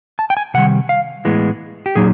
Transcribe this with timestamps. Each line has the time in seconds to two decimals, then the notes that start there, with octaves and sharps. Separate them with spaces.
0.19 A5
0.30 G5
0.37 G#5
0.54 C3 D#3 G3 F#5
0.89 F5
1.25 A2 E3 G#3 B3
1.86 G4
1.96 A#2 F#3 A#3 D#4 G#4